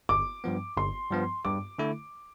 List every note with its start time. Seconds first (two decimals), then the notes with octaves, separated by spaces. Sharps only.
0.09 G1 D6
0.44 G2 F3 B3
0.77 G1 C6
1.11 G2 F3 B3
1.45 G2 D6
1.79 D3 A3 E4